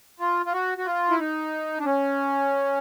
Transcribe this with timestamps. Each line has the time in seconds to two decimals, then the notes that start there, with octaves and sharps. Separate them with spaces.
0.20 F4
0.46 F4
0.53 F#4
0.78 F#4
0.86 F4
1.10 E4
1.19 D#4
1.79 D4
1.85 C#4